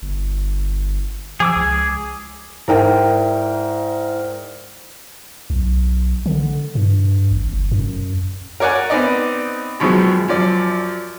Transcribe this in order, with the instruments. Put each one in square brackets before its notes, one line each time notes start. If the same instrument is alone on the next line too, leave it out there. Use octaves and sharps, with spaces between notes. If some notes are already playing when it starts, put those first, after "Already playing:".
[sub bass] G1
[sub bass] F3 [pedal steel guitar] G#4 D6 E6
[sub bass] C#2
[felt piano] G#2 A#4 G5 [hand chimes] E4 D5 E5
[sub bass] B1
D3
G2
G#1
F#1
F#2
[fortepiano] A#4 C#5 D5 F#5 G#5
B3 C4 D#4 D5 D#5
F#2 B2 D#3 F3 G#3
F#2 F3 D5